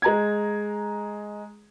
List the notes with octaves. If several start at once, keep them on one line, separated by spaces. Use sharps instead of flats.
G#3 A#5 G#6